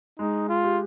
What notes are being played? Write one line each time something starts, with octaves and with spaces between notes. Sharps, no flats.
G#3 D#4
F4
G4